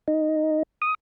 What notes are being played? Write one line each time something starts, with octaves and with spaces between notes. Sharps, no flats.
D#4
D#6